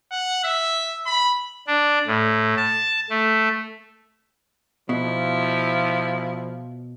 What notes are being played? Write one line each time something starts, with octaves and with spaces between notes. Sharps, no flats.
F#5
E5
B5
D4
A2
A5
A3
B2 F3 E4